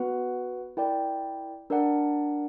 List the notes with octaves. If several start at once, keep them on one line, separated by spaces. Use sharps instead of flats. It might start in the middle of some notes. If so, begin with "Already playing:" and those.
Already playing: B3 F#4 B4 F#5
E4 A#4 D5 G5
D4 A#4 D5 F#5